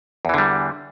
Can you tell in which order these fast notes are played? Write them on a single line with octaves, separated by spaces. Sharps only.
E2 E3 D3 G3